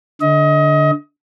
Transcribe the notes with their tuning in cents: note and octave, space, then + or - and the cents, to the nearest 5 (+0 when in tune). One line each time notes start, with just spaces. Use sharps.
D3 -5 D#5 +30